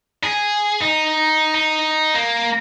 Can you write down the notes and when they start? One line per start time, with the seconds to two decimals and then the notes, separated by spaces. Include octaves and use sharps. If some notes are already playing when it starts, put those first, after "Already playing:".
0.24 G#4
0.81 D#4
1.54 D#4
2.14 A#3